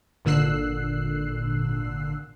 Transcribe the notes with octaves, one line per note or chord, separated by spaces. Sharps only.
G#1 A#2 D3 E6 F#6 C7